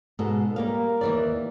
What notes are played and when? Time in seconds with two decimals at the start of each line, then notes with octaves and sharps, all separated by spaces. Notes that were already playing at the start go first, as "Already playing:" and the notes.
0.19 G#2 B2 A4
0.56 G3 A#3 A#4 F5
1.01 D#2 E3 D5